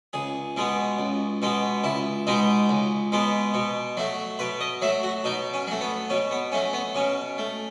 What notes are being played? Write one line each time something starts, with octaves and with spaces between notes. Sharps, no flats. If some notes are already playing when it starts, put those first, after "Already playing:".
C#2 G#4
B2 G#3 B3
C#2
B2 G#3 B3
C#2 E4
B2 G#3 B3 D#4
C#2
B2 G#3 B3
B2
F#3 A3
B2 B4
D#5
F#3 A3 E5
F#4
B2 D#4
C#4
F#3 A3
B3
B2 C#4
B3
F#3 A3 C#4
B3
B2 C#4
A3